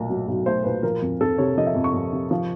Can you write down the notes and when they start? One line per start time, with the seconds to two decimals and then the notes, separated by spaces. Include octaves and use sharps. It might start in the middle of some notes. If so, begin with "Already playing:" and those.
Already playing: B1 A#2 A3
0.10 F#3
0.28 B1
0.46 A3 C5
0.64 A#2 B4
0.83 F3 A#4
1.02 F2
1.21 F2 A4
1.38 C3 C#5
1.57 F3 D#5
1.66 E5
1.75 F2
1.84 C#6
1.94 F2
2.13 C3
2.31 F3